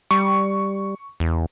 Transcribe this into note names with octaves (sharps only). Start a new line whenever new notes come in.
G3 C#6
E2